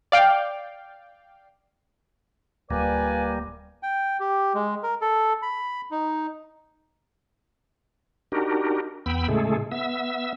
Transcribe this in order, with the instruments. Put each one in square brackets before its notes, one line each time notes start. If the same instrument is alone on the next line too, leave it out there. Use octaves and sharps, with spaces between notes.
[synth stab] D5 F5 G5
[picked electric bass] D1 [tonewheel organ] G3 A#3 [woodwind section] F4 B4 G#5 [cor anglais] D5
[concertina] G5
G4
G#3
A#4
A4
B5
D#4
[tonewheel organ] D4 D#4 F#4 G4 A#4
E2 B3 G5 B5 E6
A2 C#3 G#3 A3 G#4 A4
B3 E5 E6